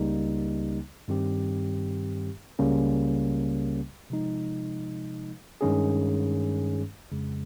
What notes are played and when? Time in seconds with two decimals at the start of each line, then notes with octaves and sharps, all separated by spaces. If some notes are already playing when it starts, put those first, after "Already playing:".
Already playing: C#2 C#3 G3 A#3 D#4
1.08 G2 D#3 G3 C4 G4
2.59 C#2 C#3 G3 A#3 C#4
4.10 C3 F3 G#3 D#4
5.61 G2 D#3 G#3 C#4 G#4
7.12 F2 C#3 G#3